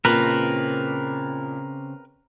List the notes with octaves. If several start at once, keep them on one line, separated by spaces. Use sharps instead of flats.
A#2 C#3 C4 D4 A#4 B4